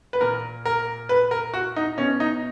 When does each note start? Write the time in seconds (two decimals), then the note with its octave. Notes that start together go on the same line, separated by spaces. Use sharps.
0.13 B4
0.21 A#2 A#4
0.65 A#4
1.09 B4
1.31 A#4
1.54 F#4
1.76 D#4
1.98 B2 C#4
2.20 D#4